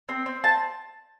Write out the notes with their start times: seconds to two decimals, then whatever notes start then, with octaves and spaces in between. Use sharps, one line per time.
0.09 C4
0.26 C4
0.44 C4 A5